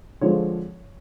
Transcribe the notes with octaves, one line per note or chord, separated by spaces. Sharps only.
D3 F3 G#3 C4 C#5